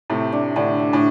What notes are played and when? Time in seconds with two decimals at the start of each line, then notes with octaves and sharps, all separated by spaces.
0.10 A2 C3 A3
0.32 D4
0.56 A2 D3
0.79 D4
0.93 A2